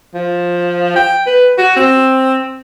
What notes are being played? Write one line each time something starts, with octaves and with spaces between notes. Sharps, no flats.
F3
G5
B4
F#4
C4